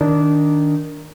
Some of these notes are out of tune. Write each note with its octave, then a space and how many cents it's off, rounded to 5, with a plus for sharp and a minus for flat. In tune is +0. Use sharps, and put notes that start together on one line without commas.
D#3 +0 D4 -10